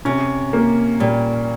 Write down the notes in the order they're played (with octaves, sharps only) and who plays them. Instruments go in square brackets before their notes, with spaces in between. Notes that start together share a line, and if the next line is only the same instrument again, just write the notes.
[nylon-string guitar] C3 [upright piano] C#4
[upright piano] A#3
[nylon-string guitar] A#2 [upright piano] G3